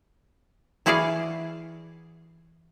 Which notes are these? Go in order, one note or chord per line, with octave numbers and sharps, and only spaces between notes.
E3 E4 F#4 G#4 D5 F5